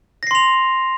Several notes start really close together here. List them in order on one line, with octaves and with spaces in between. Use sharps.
A#6 C7 C6 F7